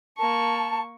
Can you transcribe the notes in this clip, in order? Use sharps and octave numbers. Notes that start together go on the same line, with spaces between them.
A#3 A5 C#6